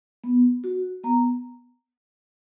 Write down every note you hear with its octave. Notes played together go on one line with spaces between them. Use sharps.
B3
F#4
B3 A#5